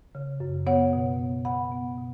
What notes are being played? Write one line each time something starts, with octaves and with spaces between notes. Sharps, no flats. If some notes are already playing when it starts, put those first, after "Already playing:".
C#3
F#2
B3 C#5 F#5
B2
B3
B2 F#5 B5
B3
B2